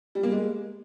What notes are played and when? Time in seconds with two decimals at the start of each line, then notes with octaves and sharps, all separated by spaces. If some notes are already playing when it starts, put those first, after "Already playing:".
0.15 G3
0.23 A#3
0.31 G#3